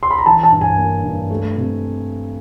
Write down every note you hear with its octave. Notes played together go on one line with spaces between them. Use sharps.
C6
B5
A#5
E3 A5
A5
G2
G#5
A#3
G2
A3
C3